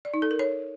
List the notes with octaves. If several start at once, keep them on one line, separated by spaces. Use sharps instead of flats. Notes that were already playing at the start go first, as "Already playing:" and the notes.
D5
D#4
A4
A#4
C#5